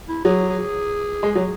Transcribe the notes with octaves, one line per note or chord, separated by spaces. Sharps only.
E4
F#3 G#4
G#4
G#3
F#3